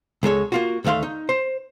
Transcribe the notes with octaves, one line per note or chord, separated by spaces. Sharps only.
C#2 G#3 A4 C#5
A#3 F4 F#4
D2 D#3 A3 F5 C6
D#4
C5